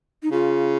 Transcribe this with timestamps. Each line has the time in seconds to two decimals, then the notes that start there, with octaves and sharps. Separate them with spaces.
0.23 D#4
0.32 C#3 F4